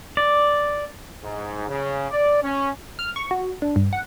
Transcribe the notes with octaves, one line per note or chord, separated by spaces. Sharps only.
D5
G#2
C#3
D5
C#4
F6
C#6
F#4
D4
G2
F#5